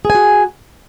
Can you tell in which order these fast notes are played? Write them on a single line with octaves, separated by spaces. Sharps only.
G#4 G#5 F#4